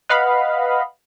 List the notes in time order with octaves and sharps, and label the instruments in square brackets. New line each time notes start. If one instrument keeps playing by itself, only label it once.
[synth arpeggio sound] B4 D#5 F5 F#5 B5